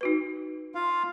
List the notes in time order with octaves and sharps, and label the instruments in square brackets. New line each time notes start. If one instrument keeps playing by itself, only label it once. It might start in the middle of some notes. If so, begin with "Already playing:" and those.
[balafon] D#4 F#4 B4
[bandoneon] F4 F5